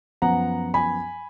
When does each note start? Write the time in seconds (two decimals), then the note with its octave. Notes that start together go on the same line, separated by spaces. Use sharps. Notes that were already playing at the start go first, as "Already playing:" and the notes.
0.22 F#2 F3 B3 F#5 A#5
0.74 G#5 B5